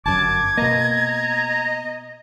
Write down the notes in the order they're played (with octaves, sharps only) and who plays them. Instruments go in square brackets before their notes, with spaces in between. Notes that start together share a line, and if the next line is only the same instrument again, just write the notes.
[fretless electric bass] G1 F#2 [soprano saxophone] A5 [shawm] D6 [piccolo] G#6
[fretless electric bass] B2 A#3 [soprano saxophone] D#5 [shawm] A#5